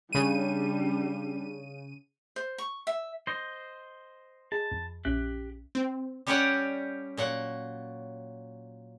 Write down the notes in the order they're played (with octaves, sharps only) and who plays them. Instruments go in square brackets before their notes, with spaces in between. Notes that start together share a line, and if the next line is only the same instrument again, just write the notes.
[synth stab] C#3 D#7 [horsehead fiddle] G3 D4
[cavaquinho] C5
C#6
E5
[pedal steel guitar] C5 D#5
[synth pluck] G#4 D#5 B5 [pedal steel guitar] A5
[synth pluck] F2
[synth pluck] A#1 C#4 E5 [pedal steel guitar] G4 F#6
[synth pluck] C4
[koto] G3 C#4 G4 C#5 D5 F#5
A#2 F#3 F#5